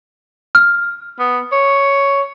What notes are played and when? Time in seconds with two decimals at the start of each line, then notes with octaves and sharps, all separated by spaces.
0.55 F6
1.19 B3
1.52 C#5